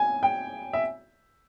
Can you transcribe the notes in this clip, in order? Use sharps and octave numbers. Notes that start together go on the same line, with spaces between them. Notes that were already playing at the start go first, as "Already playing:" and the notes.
Already playing: G#5
G5
E5